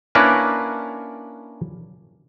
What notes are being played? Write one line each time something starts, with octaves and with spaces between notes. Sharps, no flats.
A#3 C#4 D4 E4 A#4 B4